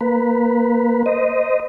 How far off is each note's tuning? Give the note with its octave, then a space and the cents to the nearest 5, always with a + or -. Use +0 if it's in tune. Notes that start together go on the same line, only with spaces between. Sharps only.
A#3 +0 B4 +0
C5 -25 D#5 +0